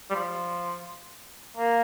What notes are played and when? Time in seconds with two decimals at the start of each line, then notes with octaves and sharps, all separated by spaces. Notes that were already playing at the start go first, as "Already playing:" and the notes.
0.11 G3
0.15 F3
1.57 A#3